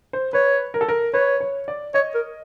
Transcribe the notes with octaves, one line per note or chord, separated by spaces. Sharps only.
C5
B4 C#5
A#4
A4
A#4
B4 C#5
C#5
D5
C#5 D#5
A#4